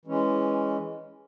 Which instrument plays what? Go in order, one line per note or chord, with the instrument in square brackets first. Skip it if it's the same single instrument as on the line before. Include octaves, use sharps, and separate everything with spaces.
[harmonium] E3 G#3 C#4